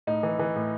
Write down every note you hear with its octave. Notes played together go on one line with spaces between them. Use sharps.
A2 D#4
E3
E3
A2